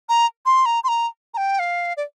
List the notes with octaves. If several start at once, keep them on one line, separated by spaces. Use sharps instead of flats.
A#5
C6
A#5
C6
A#5
A#5
G5
F5
D5